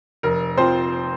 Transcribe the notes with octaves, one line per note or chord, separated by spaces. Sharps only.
F1 A#4
F3 C4 C5